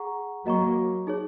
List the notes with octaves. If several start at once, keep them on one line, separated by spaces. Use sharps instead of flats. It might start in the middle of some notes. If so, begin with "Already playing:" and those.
Already playing: G#4 F#5 A#5 C#6
F#3 A#3 F#4 D#5 A#5 C#6
D#4 G#4 C#5